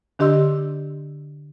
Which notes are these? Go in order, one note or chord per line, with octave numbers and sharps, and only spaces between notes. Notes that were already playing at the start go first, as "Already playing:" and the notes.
D3 D4 G4 D#5 C6 E6